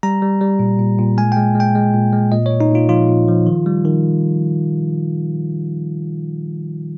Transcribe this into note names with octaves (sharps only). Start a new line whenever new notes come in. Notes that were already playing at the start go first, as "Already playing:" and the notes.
G3 A#5
G3
G3
A#2
A#2
A#2
G#3 G#5
G#3 G5
G#3 G5
G#3
A#2
G#3
A#2 D#5
C#5
A#2
D#4
A#2 F4
F3 F4
A#2
F3
D#3
G3
D#3